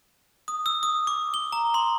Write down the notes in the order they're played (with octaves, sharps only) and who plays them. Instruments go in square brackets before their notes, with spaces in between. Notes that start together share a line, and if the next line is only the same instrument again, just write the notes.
[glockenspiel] D#6
E6
D#6
D6
G7
A#5
C6